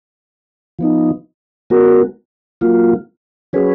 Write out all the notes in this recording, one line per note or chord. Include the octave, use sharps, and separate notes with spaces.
F3 B3 D#4
G#3 B3 F#4 A#4
F#3 A#3 F4
F#3 C#4 G#4 B4